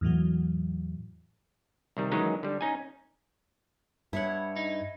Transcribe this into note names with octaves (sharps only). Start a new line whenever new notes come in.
E2 A2 E3 F#3
C2 D#3 G3
D#3 E3 F#3 G#3 C#4 D#4
D3 G3
C#4 D#4 G#5
G2 E4 C#5 F#5
D#4